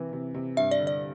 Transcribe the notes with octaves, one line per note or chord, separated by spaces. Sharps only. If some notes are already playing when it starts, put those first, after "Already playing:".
Already playing: C3 E3
C3
C3
G2 E5
D5
D3
D5